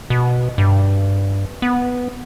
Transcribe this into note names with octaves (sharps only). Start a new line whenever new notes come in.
B2
G2
B3